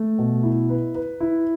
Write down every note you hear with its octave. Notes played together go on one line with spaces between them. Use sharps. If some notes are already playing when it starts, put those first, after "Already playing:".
Already playing: A3
B2
E4
B4
B4
E4